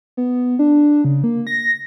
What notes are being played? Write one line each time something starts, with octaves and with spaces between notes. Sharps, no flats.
B3
D4
C#3
A#3
A#6